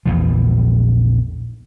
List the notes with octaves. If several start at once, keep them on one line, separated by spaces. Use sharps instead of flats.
A#1 E2 A#2 F3